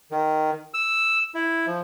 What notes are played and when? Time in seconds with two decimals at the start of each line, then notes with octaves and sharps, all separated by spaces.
0.11 D#3
0.74 E6
1.35 E4
1.67 F3